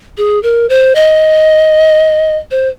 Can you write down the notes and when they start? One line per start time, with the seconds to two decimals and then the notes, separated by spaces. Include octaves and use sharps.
0.18 G#4
0.43 A#4
0.70 C5
0.95 D#5
2.51 C5